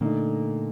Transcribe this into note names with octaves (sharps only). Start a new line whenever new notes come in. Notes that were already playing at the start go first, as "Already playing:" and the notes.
A#2 D3 A3 D#4